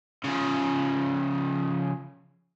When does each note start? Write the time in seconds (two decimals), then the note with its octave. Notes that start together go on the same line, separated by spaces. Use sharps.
0.24 C#3 F3